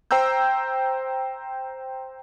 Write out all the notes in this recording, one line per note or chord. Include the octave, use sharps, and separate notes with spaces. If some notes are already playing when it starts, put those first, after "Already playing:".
C5 G5 A#5 E6 G6